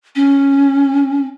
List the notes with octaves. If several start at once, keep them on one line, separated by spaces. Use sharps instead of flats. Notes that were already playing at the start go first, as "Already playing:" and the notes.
C#4